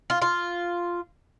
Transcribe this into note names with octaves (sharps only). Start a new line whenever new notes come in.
F4
F4